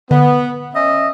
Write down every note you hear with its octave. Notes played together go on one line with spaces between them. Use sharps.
D3 B3
C#4 D#5 E5